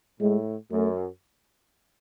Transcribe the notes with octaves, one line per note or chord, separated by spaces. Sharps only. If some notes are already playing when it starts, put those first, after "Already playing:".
A2 G#3
F#2 A3